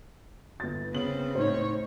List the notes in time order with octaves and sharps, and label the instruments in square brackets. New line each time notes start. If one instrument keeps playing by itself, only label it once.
[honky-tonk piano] G1 A6
[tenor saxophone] C#3 [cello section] B3 C4 [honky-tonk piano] F#7
[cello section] A2 C#5 [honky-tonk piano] D#4 C5